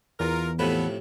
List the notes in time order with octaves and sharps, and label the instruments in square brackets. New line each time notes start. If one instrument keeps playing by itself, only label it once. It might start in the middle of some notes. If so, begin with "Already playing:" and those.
[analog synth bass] E2 [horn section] F4 A#4
[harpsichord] A2 C3 F3 [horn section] B3 A4 B4